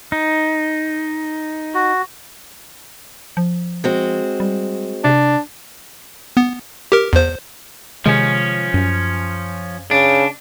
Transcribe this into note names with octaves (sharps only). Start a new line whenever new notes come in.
D#4
F#4
F3
G#3 C4 F#4
G3
C3 D4
B3
G4 A#4
E2 C5
C3 D#3 F3 G#3 C#4
F#2
C#3 D4